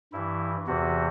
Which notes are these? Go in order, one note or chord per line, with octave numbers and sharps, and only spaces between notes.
G2 E3 E4
E2 C3 E3 F#4